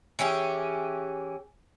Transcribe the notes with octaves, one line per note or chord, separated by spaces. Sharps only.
E3 C#4 G4 G#4